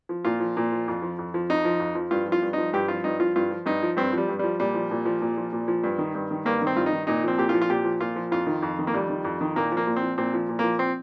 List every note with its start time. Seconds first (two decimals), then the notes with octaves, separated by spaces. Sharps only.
0.09 F3
0.25 A#2 F4
0.40 F3
0.57 A#2
0.72 F3
0.88 F2
1.02 F3
1.19 F2
1.34 F3
1.50 F2 D#4
1.65 F3
1.80 F2
1.95 F3
2.11 G2 F4
2.26 F3
2.32 F4
2.42 G2
2.53 D#4
2.58 F3
2.73 G2 G4
2.88 F3 F4
3.04 G2 D#4
3.20 F3 F4
3.36 G2 F4
3.51 F3
3.66 G2 D#4
3.82 F3
3.97 G2 C4
4.13 F3 G3
4.29 G2
4.39 F3 G3
4.60 A#2 G3
4.75 F3
4.91 A#2
5.05 F3
5.22 A#2
5.38 F3
5.53 A#2
5.68 F3
5.84 G2
5.98 D#3
6.15 G2
6.31 D#3
6.45 G2 A#3
6.62 D#3
6.67 C4
6.76 G2 F4
6.86 D#4
6.93 D#3
7.07 A#2 D#4
7.24 F3 C4
7.38 A#2 G4
7.49 F4
7.54 F3
7.62 F4
7.70 A#2 G4
7.84 F3
8.00 A#2 F4
8.16 F3
8.32 F2 F4
8.46 D#3
8.62 F2
8.79 D#3
8.87 A#3
8.94 F2 G3
9.09 D#3
9.25 F2
9.41 D#3
9.56 A#2 A#3
9.72 F3
9.77 A#3
9.87 A#2
9.96 C4
10.02 F3
10.18 A#2 C4
10.34 F3
10.49 A#2
10.59 F3 A#3
10.79 C4